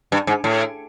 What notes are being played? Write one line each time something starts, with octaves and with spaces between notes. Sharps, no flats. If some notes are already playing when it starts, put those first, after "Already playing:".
G2
G#2
A2